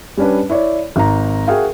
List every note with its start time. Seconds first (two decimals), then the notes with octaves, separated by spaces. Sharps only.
0.17 G3 C#4 D4 B4
0.50 E4 C#5 D5
0.96 G#1 A#5
1.47 F#4 G#4 A#4 E5 F5 G5